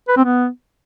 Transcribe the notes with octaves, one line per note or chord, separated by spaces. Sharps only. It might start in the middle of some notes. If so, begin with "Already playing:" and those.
B4
C4
B3